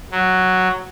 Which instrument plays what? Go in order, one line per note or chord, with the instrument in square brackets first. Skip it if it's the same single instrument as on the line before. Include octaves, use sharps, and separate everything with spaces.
[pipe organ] F#3